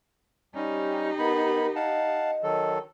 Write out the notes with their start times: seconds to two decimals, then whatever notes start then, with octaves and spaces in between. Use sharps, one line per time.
0.55 G3 C#4 D#4 G4
1.19 B3 A#4 B5
1.76 D#5 F5 F#5 A5
2.43 D#3 F#3 A4